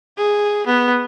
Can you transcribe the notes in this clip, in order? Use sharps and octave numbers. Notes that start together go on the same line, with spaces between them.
G#4
B3